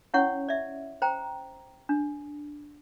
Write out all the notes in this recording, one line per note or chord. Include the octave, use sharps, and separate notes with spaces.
C#4 E4 C#5 F#5 C#6
D5 E5
C5 G5 A#5
D4